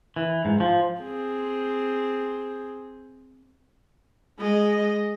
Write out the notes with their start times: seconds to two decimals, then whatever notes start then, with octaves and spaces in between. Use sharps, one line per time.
0.16 E3
0.45 G#2
0.60 F3
1.00 C4 G#4
4.39 G#3 D#5